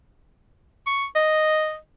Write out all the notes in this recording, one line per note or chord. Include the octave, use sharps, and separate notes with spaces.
C#6
D#5